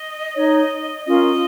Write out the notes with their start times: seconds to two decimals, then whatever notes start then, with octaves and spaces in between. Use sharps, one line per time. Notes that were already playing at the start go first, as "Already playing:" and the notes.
Already playing: D#5
0.34 D#4 C#5
1.05 C#4 F4 A#4 D#5